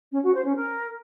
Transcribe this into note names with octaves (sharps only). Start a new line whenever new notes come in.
C#4
F#4
C5
C#4
A#4